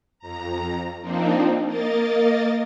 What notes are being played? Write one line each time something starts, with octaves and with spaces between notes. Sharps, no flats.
F2 A#5
F3 A#3 C4 D4 D#4
A#3 A#4 D#5 A6